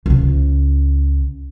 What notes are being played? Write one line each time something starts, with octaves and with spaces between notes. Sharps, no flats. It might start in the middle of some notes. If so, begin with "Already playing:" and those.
C#2 C#3